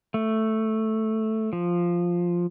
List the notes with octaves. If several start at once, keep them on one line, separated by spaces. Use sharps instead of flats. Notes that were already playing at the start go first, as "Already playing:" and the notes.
A3
F3